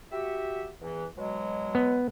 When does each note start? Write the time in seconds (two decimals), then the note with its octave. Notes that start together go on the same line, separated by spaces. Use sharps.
0.12 F#4 G4 E5
0.82 E2 E3
1.17 B2 F#3 G#3
1.75 B3